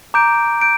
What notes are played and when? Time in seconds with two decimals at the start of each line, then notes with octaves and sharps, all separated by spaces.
0.14 A#5 D6 G6 D7
0.61 G6 D7